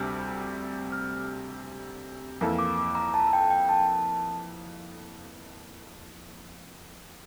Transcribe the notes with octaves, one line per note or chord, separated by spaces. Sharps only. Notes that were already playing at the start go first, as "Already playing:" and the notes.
Already playing: D2 C3 G3 D4 F6
F6
F2 E3 A#3 E4 A4
D6
D6
A#5
A5
G5
G5
A5